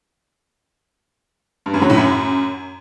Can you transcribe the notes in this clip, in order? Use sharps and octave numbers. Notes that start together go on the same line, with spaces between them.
G2
F#2
F#3
A2
F#2